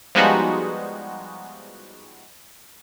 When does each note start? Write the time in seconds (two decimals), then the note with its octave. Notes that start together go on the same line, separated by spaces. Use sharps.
0.15 F3 G3 G#3 B3 D#4 F#4